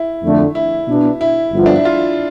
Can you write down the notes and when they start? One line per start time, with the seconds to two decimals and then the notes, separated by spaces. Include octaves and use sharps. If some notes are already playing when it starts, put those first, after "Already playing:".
Already playing: E4
0.23 F2 D3 A3
0.55 E4
0.88 B2 B3 D4
1.21 E4
1.52 G1 G2 F3 B3 F4
1.66 D4
1.76 E4
1.85 F4